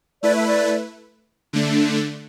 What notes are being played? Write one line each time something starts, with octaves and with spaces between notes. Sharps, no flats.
A3 E4 B4 D5
E5
D5
D3 A3 D4